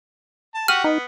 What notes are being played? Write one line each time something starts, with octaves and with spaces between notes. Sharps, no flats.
A5
F#4 G4 F#5 F6 D#7
B3 D#4